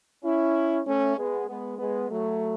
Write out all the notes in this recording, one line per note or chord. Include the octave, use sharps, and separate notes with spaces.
C#4 E4
A3 C#4
G#3 B3
G#3 B3
G#3 B3
F#3 A3